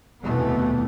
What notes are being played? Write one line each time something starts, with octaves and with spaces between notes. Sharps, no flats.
F1 D#2 B2 E3 A3 B3